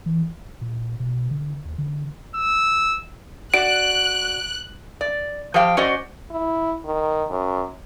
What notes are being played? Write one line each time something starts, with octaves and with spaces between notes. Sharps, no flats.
E3
D1
A#2
B2
D3
D#2
D3
E6
F#4 D5 F#6 D7
D5
F3 G4 F5 G5
C#4 F#4 C5 D5 D#5
E4
D#3
F#2